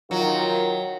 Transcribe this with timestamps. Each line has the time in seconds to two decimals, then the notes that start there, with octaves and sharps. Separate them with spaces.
0.11 D#3 F#3 F4